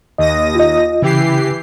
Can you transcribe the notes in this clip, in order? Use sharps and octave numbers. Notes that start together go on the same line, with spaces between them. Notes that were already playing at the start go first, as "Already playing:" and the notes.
D#2 D#5 D#6 A#6
F4 D#5
C#3 E3 G4 C7